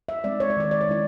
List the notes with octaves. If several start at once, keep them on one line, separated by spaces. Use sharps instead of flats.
E5
G#3 C4 D#4 D5
C#5
D5
D#3 C#5
D5
C#5
G#3 C#4 E4 D5